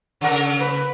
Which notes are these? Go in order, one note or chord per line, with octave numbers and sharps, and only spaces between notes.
C#3 A#4
B4